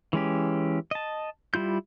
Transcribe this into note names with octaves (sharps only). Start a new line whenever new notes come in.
E3 G#3 C#4 G4
D#5 A5
G3 E4 F4 G6